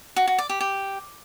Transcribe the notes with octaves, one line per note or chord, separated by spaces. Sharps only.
F#4
F#4
D5
G4
G4